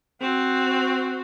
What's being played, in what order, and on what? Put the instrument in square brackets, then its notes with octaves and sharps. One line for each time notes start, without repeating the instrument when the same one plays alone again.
[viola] C4 F#4